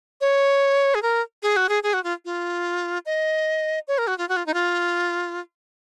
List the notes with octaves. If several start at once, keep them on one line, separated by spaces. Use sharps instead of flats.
C#5
G#4
A#4
G#4
F#4
G#4
G#4
F#4
F4
F4
D#5
C#5
A#4
F#4
F4
F#4
F4
D#4
F4